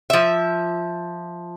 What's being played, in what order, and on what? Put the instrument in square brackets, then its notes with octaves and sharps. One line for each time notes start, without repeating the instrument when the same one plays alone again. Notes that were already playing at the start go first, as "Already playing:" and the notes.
[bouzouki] F3 E5